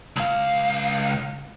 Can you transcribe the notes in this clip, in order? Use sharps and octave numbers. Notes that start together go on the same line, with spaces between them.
C#2 F5